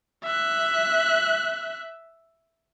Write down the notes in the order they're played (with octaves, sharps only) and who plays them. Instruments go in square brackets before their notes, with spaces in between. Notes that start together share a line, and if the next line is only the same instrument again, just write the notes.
[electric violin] E5 F#6